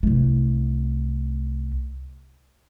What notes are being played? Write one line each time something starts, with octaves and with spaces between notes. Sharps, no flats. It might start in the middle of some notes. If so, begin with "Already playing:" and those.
C2 A3